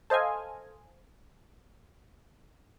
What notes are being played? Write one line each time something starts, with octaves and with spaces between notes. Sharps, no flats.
A4 C5 D#5 F5 G#5